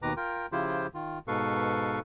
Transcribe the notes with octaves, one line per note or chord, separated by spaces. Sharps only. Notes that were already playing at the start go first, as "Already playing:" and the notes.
D#2 B2 D#3 B4 A#5 D6
F4 A#4 G5
C#3 F3 E4 F4 G4 C5
D#3 F4
G#2 B2 A4 B4 F5 C#6